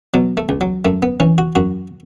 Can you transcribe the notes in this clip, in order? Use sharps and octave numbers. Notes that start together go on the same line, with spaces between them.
B2 F#3
A3
C#2
F#3
F#2 A3
B3
E3 C#4
F#4
F#2 F#4